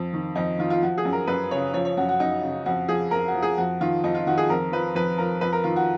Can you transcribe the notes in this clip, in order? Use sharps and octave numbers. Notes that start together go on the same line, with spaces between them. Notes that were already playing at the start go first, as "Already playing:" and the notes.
Already playing: F2 F3
D#3
F2 D#4
D#3 F4
F4
F3 F#4
G#4
F#2
A#4
F#2 B4
C#3 C#5
F3 C#5
C#5
F#2 F#4
F#4
F#2 D#4
C#3
F2 F#4
F3 G#4
F2 A#4
F#4
F3
G#4
F2 F#4
D#3 F4
F2 D#4
F4
D#3 F#4
G#4
F2 A#4
F3 B4
F2 B4
F3 A#4
F2 B4
A#4
D#3 F4
F#4